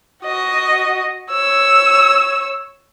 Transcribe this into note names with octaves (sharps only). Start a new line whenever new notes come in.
F#4 D#5
C#5 E6